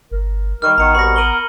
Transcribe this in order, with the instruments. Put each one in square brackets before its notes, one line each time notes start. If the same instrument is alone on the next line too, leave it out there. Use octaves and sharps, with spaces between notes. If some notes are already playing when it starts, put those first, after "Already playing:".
[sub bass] G1 [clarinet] A#4
[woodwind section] D#3 G3 [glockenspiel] C#6 F6
[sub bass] A1 [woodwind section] D#3 [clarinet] B3 [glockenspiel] A#5 C#7
[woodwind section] C2 B2 C#6 [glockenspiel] B5 A#6
[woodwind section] A#4 [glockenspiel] D#7 F#7 G7